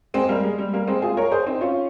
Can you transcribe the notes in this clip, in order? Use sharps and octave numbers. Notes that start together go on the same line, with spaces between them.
G#3 C4
G3 A#3
G#3
G3
G3 A#3
G#3 C4
F4 G#4
A#4 C#5
G#4 C5
C4 D#4
C#4 F4